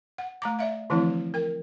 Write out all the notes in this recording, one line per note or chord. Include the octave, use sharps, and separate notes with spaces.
F#5
A3 A#5 D6
D5 E5 F5
D3 E3 F3 A3 C4 E4
A#4 G5